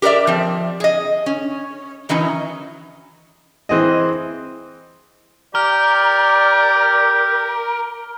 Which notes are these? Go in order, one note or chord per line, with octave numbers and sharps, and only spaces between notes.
G4 A#4 B4 D5 E5
F3 C4
G#4 D#5
C#4
D#3 E3 F#3 C#4 D#4
E3 C4 G#4 D#5
G4 A#4 D5 F6